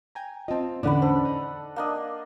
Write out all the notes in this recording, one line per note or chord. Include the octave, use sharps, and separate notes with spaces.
G5 G#5 A#5
C4 F4 D#5 A5
E2 A2 D3 C#4 D4 D5 F#5 B5
A4 C5
D#4
A#3 D4 D#5